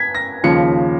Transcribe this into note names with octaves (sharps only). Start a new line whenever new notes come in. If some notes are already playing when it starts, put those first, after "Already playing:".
Already playing: G#6 B6
A#6
D#2 C#3 F3 C#7